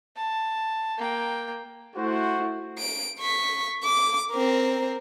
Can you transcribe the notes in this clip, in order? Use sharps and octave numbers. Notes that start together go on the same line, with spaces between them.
A5
A#3 G5
A3 E4 F#4 C5
D7
C#6 B6
D6
C4 A#4